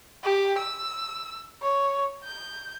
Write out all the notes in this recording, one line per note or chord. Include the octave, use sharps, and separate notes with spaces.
G4
E6
C#5
G6